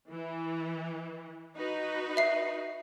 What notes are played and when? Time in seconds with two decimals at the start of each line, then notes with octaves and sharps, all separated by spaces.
0.12 E3
1.57 D#4 F#4 B4
2.17 E5 C7